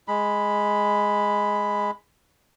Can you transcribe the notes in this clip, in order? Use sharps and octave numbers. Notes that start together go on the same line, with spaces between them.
G#3 B5